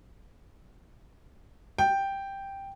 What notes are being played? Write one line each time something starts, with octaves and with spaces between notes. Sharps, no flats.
G5